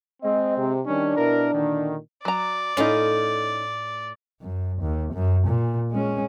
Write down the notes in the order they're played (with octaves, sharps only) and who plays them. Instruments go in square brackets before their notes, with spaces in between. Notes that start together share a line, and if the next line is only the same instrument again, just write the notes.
[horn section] G#3 C4 [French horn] D#5
[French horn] C3
[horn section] D#3 G3 C#4 [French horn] D4
[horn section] B2 E4 A#4
A#2 D3 D#3
[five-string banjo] F#3 A#5 [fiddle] D5
[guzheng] A2 F4 [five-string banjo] C#4 D#4
[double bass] F#2
D#2
F#2
A#2
G#3 C#4